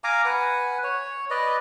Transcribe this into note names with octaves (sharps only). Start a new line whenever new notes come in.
F5 G#5 A#5 D6
B4 F#5 G#5
C#5
B4 D5 D#5